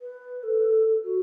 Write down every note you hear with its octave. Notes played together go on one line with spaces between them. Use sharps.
B4
A4
F#4